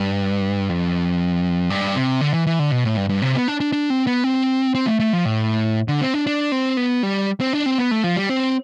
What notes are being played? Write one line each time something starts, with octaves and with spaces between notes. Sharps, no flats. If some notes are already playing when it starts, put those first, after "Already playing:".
Already playing: G2
F2
G2
C3
D3
E3
E3
D3
B2
A2
G2
G2
C3
B3
D4
D4
D4
C4
B3
C4
C4
A3
A3
F3
A2
D3
C4
D4
D4
C4
B3
G3
C4
D4
C4
B3
A3
F3
G3
C4